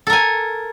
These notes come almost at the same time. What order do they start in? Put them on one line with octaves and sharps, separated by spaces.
A4 A#4 G#5